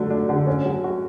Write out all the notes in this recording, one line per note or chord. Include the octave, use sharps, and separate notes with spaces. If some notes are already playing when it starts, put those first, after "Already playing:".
Already playing: D3 F#3 A3 D4
D4
D3
C#4
F#3
F#4